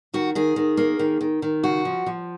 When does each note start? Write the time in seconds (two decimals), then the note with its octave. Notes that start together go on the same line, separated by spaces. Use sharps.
0.14 D#3 F#4
0.35 D#3 G#4
0.56 D#3
0.77 A#3
0.99 D#3
1.21 D#3
1.42 D#3
1.64 C#3 F#4
1.85 F3
2.06 F3